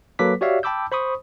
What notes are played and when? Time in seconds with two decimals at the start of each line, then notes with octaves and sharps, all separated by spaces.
0.19 F#3 A#3 A4 B4 D6 B6
0.41 F#4 G4 C#5 D5 E5 F5
0.63 G5 A5 B5 D6 E6 G6
0.92 C5 B5 C#6 D#6